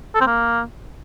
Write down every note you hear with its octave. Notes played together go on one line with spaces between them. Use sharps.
A4
C4
A#3